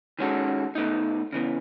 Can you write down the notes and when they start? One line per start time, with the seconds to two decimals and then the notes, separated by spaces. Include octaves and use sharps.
0.19 D#3 G#3 C#4 F#4 A4
0.75 B2 A3 D#4
1.33 C#3 E3 B3